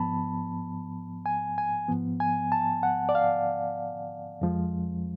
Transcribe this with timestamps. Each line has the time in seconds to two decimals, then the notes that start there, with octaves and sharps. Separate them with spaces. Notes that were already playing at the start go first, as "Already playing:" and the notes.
Already playing: G#2 F3 B3 A5 B5
1.26 G#5
1.58 G#5
1.88 G#2 F3 B3
2.20 G#5
2.52 A5
2.83 F#5
3.09 D5
3.15 F5
4.41 F2 F3 G#3